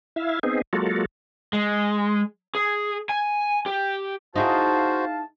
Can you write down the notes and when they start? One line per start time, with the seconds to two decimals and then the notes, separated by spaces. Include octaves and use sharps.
0.16 E4 E5 F5
0.43 B3 C4 D#4 G#4
0.73 F#3 G#3 A#3 F4 F#4 A4
1.53 G#3
2.55 G#4
3.09 G#5
3.66 G4
4.36 D#4 E4 F#4 G#4 C5 F5 A5